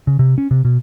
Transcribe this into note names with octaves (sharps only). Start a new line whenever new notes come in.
C#3
C3
C#4
C3
B2